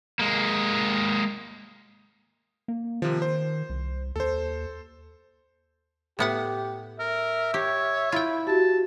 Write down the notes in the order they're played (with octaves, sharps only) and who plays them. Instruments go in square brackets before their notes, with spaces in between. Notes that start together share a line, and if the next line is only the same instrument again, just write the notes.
[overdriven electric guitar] G#3 A#3
[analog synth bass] A#3
[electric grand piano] C3 F3 [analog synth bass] D#3
[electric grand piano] C5
[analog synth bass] C2
[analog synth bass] D#2 [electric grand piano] A4 C5
[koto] A2 B3 F#5 [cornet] G4
[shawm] A#4 [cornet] E5
[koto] G4 [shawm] C#5
[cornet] E4 [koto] F4 G5
[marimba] F#4 G4 [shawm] A5